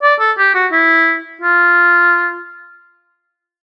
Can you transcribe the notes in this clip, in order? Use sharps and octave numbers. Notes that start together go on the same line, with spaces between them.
D5
A4
G4
F#4
E4
F4